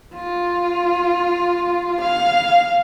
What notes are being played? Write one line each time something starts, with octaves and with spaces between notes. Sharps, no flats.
F4
F5